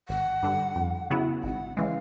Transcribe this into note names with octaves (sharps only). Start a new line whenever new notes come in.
G#1 F#5
G2 D3
F2
C#3 F#3 B3 E4
G#1 F#5
C#3 E3 G#3 F5